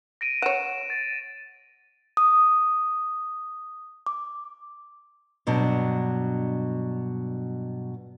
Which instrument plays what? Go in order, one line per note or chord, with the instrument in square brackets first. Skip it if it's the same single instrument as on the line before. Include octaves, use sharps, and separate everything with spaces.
[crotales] A#6 D7 D#7
[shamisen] C#5 F#5 [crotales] E7
[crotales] A6
[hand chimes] D#6
D6
[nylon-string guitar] G2 B2 F#3 D4